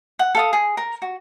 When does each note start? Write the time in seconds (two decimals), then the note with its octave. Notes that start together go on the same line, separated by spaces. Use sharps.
0.19 F#5
0.35 A4 F5 D#6
0.53 G#4
0.77 A#4
1.02 F#4